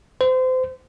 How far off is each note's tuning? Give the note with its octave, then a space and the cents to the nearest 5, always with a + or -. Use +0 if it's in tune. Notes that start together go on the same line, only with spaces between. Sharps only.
C5 -30